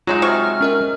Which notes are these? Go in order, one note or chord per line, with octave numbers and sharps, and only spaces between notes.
F#3 G#3 D#4 F4 C#5 E5 E7
C3 C#6 F6
C#4 A#4 D#5